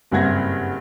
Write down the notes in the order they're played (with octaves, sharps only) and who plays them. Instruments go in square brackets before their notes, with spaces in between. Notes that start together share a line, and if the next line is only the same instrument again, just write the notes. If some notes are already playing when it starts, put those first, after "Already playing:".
[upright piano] F#1 G2 C4 F#5 G#6 A#6